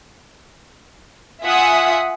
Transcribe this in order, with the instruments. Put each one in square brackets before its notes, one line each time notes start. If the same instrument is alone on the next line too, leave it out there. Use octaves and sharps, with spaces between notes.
[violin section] F4 E5 F#5 G#5 D#6